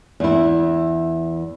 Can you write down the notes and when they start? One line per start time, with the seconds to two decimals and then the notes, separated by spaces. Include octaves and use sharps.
0.20 E2 E4